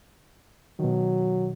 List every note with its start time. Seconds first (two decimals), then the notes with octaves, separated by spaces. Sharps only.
0.80 B2 D#3 F#3